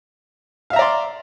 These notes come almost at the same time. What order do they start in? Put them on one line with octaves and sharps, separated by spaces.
F5 E5 A#5 D5 C6